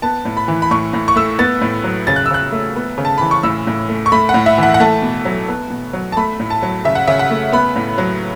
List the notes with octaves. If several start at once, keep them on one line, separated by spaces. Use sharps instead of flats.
B3 A5
A2
B5
E3
B5
A2 C#6
A2
C#6
A3 E6
B3 A6
A2
F#3
C#3 A6
F#6
E6
C#3 F#6
A3
B3
C#3
A5
E3 B5
C#6
A2 E6
A2
A3
C#6
A3 B5
F#5
A2
E5
E3 F#5
F#5
A3 A5
B2
F#3
B3
B2
F#3
A5
A3 B5
A2
A5
F#3
C#3 E5
F#5
C#3 E5
F#5
A3
B3 B5
A2
F#3